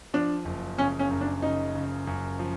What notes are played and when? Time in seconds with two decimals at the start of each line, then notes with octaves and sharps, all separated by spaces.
0.14 F3 D4
0.45 F#1
0.78 C#3 C#4
0.99 C#4
1.11 F#2
1.21 D4
1.42 C#3 D#4
1.75 C#3
2.07 F#2
2.39 F3